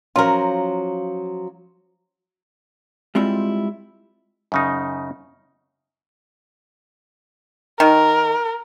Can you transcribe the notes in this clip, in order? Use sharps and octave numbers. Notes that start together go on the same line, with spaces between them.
F3 F#3 C#4 F4 A#4
G3 G#3 C4 E4 F4
F#2 C#3 D#4
D#3 A#4